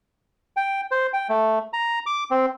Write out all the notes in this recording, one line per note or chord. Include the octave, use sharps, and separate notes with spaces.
G5
C5
G5
A3
A#5
D6
C4